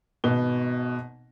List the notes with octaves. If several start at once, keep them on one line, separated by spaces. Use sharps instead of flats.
G#1 B2 B3 G7